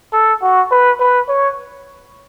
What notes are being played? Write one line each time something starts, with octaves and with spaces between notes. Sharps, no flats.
A4
F#4
B4
B4
C#5